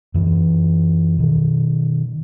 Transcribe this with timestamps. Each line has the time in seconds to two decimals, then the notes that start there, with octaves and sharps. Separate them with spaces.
0.14 F#2 E3
1.19 B2 D#3